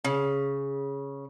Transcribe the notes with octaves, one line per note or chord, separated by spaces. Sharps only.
C#3